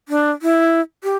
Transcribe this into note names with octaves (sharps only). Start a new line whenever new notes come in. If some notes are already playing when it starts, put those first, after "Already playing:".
D4
E4
G4